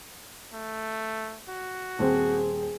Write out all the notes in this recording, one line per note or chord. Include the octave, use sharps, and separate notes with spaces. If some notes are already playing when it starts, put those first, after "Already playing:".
A3
F#4
D#1 C4 G#4